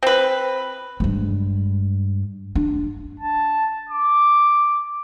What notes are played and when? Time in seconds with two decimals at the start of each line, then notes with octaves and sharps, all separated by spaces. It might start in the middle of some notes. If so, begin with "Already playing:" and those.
0.03 C4 B4
1.00 G2 G#3
2.55 D4
3.20 A5
3.89 D6